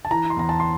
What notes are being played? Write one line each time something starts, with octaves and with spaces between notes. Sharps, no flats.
A5
E3 A#5
C6
E2 A#5
A5
C6